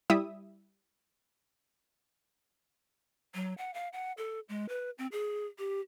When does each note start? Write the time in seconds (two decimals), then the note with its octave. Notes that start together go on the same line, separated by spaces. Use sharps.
0.10 G3 E4 E5 D#6
3.35 F#3
3.58 F#5
3.74 F5
3.93 F#5
4.17 A4
4.49 G#3
4.69 B4
4.98 C4
5.12 G#4
5.59 G4